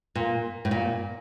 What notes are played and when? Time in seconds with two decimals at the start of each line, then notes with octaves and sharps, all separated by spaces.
0.15 A#2
0.65 A2
0.71 A#2